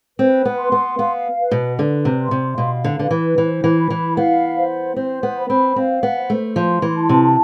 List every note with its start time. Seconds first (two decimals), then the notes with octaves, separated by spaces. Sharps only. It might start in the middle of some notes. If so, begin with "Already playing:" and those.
0.19 C4 B4
0.45 B3
0.59 C6
0.72 B3
0.98 B3 F5
1.38 B4
1.51 B2
1.78 D3 B4
2.05 C3
2.18 C6
2.31 C3
2.57 B2 F5
2.84 D3
2.98 D3 B4
3.11 E3
3.38 E3 C5
3.64 E3
3.77 B5
3.90 E3
4.17 B3 F5
4.57 C5
4.96 C4 C5
5.23 B3
5.36 B5
5.50 C4
5.76 C4 F5
6.03 B3
6.16 C5
6.30 A3
6.56 F3 C6
6.82 E3
6.96 A5
7.09 C3